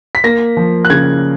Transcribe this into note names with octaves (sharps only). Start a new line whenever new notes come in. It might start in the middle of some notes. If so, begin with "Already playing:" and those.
B6
A#3 A#6
F3
F#6
C#3 G#6